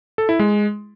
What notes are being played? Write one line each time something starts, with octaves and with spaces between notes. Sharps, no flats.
A4
E4
G#3